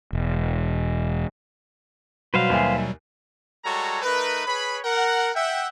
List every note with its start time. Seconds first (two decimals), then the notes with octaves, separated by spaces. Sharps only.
0.13 E1
2.34 B2 F#3 G3 F#4 B4 C5 F5
2.50 D#2 E5 G#5
3.64 G3 G#3 F#4 A4 C#5 A#5
4.02 A3 D#4 A#4 B4
4.46 G#4 B4 C#5 B5
4.85 A#4 F#5
5.35 E5 F#5 G5